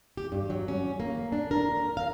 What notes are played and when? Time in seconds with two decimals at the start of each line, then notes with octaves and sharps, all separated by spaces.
0.17 G4
0.32 G2
0.50 F#3
0.68 C#4
1.00 A#3
1.32 D4
1.51 A#4
1.97 F5